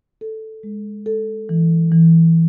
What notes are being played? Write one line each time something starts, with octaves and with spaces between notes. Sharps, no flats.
A4
G#3
A4
E3
E3